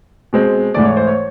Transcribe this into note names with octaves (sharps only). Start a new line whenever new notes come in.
B2 G#3 C4
G#2 E3 A3 D5
C#5
C5
C#5